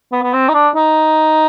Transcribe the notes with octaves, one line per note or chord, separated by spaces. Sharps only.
B3
B3
C4
D#4
D4
D#4